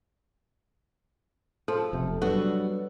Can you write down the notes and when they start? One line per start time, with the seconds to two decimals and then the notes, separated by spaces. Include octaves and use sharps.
1.68 F3 A4
1.93 F1 C3
2.22 F#3 G3 B3 D4 F#4 A4